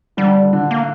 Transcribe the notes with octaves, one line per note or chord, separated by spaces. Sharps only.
D3 G3
D3
D3
A#3